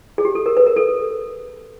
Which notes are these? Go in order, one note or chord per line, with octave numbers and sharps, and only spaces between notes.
G#4
G4
A4
A#4
B4
A#4
A4